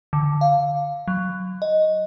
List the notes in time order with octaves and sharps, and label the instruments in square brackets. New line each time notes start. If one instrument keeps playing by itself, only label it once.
[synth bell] D3
F5
F#3
D#5